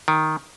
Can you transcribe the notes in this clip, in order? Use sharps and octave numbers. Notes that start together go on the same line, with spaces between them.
D#3